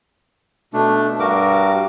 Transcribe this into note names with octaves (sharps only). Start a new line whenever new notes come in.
B2 A3 D4
G2 F#4 A#4 D6